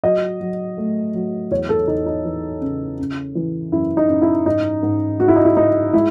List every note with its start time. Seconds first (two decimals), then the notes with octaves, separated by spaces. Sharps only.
0.03 F#3 D#5
0.40 F#3
0.78 A3
1.14 F#3
1.51 E2 C#5
1.69 A4
1.88 E2 D#4
2.06 D#4
2.25 E3
2.61 C#3
2.99 C#3
3.35 E3
3.72 F#2 E4
3.97 D#4
4.09 F#2
4.22 E4
4.46 G#2 D#4
4.83 G#2
5.20 G#2 F#4
5.28 E4
5.36 D#4
5.45 E4
5.57 G#2 D#4
5.93 G#3 E4